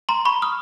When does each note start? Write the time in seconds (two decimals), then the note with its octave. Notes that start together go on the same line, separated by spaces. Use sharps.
0.09 A#5 C6
0.25 B5 C#6
0.42 D#6 F6